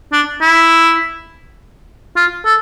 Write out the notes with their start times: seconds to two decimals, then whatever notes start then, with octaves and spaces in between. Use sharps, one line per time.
0.13 D4
0.42 E4
2.16 F4
2.46 A4